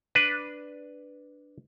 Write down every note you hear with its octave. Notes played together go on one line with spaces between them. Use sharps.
D4 B4